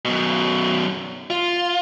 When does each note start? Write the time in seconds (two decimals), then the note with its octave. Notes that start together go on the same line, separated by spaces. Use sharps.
0.05 F#2 B2
1.30 F4